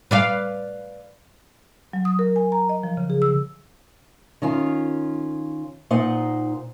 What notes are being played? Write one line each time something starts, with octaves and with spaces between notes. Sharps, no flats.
B4 D5 F5
F#3
D#6
A#4
G#5
A#5
D#5
F3
C#3
G#4
E6
D#3 C#4 F4
A#2 D#4 C5 F#5